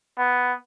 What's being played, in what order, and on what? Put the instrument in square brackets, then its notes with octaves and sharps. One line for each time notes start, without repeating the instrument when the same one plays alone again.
[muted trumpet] B3